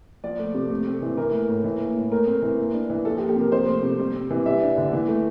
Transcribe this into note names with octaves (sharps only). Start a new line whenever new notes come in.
F3 D5
A3
C3
A3
C4
E3
E3 A#4
A3
A2
E3
A#3
A2
A3 A#4
C4
E3
A#3
D4
E3
F3 A4
G4
A#3
G4
C3 A#4
F3 C5
A3
C3
G3
C4
E3
G3 E5
D4
D3
E3
A3